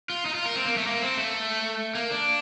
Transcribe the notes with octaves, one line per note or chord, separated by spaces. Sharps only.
F4
D#4
F4
A#4
C4
A#3
A3
A#3
C4
A3
A#3
D4